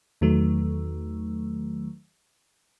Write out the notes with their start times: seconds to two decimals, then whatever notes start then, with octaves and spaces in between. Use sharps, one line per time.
0.21 E2 D#3 F#3 A3